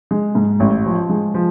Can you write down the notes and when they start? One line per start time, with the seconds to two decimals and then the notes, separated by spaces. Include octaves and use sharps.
0.11 G#3
0.35 G#2
0.60 A1
0.86 F3
1.10 G#3
1.34 F3